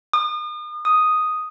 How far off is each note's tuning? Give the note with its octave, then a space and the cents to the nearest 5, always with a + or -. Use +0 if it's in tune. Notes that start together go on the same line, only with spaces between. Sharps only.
D#6 -40
D#6 +0